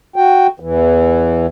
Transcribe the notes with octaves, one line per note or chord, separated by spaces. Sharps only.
F#4 G5
E2 E3